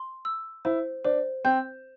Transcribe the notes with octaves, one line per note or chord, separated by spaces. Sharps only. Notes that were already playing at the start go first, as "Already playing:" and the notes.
Already playing: C6
E6
E4 C5
D4 C5
C4 G6